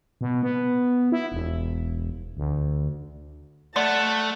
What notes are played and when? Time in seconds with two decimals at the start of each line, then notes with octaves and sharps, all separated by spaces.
0.21 B2
0.43 B3
1.12 E4
1.32 E1
2.37 D2
3.76 A3 D5 D#5 F#5 A5 C6